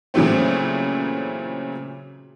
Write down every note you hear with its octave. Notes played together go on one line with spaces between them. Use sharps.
A#2 C#3 E3 F#3 A3 C4